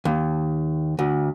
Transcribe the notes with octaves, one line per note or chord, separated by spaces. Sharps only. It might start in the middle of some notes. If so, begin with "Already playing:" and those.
D#2
D2